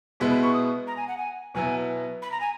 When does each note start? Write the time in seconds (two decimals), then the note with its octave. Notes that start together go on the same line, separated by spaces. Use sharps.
0.20 B2 G#3 B3 E4
0.31 B5
0.42 C#6
0.54 D#6
0.87 A#5
0.97 G#5
1.08 F#5
1.18 G#5
1.54 B2 F#3 B3 E4 G#5
2.22 B5
2.32 A#5
2.41 G#5